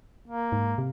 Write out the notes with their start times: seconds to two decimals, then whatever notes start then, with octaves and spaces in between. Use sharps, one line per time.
0.28 A#3
0.52 G#2
0.78 C3